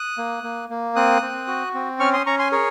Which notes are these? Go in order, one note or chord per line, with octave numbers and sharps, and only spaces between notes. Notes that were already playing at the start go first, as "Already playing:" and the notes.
Already playing: D#6 F#6
A#3
A#3
A#3
C4 D#6 F#6
C4
F#4
C4
C#4 C#6 F6
C6 D#6
C#4 A#5 C#6
G#5 C6
G#4 A#4 C#5